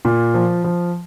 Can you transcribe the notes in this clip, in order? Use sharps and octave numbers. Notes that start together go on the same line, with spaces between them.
A#2
F3
F3